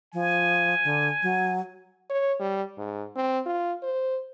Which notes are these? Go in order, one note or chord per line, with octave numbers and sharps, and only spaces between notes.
F3 G#5
D3
F#3
C#5
G3
G#2
C4
F4
C5